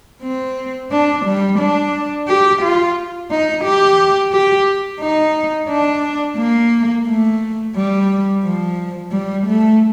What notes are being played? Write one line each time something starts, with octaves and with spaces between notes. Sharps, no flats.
C4
D4
G3
D4
G4
F4
D#4
G4
G4
D#4
D4
A#3
A3
G3
F3
G3
A3